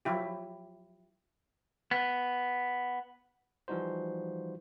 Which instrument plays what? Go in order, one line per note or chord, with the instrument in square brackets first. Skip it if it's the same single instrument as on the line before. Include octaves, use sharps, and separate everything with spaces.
[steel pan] F3 F#3 E4 G4
[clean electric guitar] B3
[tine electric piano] E3 F3 G3 D#4 F#4 C5